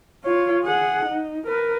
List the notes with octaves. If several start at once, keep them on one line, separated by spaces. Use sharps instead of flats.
F4 C#5
G#4 F#5
D#4
A#4 B4